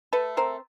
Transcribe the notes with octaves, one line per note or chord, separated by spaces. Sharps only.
A3 A4 B4
C4 A#4 C5